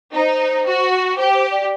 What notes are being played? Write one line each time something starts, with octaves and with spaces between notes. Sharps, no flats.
D#4 C5
F#4
G4 C5
C5
D5